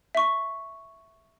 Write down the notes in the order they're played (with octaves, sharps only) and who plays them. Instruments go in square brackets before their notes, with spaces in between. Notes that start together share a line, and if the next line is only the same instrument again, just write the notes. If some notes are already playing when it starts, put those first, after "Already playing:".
[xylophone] E5 C#6